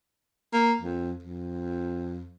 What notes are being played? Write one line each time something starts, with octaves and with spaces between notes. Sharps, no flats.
A#3
F2
F2